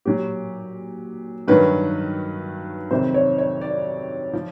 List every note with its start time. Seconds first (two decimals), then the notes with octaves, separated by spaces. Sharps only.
0.05 A#2 F#3 G4
1.48 G2 D#3 F#3 B4
2.91 F2 C3 D#3 F#3 C5
3.14 C#5
3.38 C#5
3.61 D5
4.33 F3